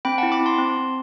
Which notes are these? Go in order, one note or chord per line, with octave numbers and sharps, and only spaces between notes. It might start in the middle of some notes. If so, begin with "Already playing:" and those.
C4 G5 B5
F#5 A5
E4
B5 D6
C4
A5 C6
C4
C4